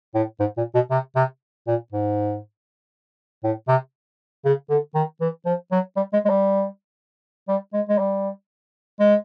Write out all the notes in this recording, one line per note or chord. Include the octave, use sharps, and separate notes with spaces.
A2
G#2
A#2
B2
C3
C3
A#2
G#2
A2
C3
C#3
D3
D#3
E3
F3
F#3
G3
G#3
G#3
G3
G3
G#3
G#3
G3
G#3